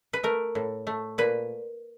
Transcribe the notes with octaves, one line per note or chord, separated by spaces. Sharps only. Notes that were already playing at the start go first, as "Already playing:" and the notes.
B4
A3 A#4
A2
A3
A#2 B4